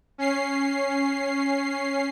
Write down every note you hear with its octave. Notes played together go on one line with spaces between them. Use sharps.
C#4 C7